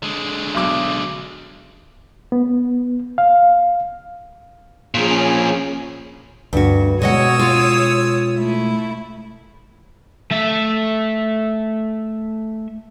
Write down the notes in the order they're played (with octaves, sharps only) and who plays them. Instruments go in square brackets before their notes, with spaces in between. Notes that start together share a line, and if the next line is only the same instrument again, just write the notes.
[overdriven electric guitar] D3 G#3
[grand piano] B1 D6
[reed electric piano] B3
F5
[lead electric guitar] A#2 F3 [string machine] C#4 G#4
[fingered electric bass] D2 [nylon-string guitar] G2 F#4
[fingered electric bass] B2 G#3 [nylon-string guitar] F#4 D#5 F#5 [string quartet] C#5 D#6 E6
[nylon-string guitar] F4
[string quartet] A3 E4
[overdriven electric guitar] A3 E5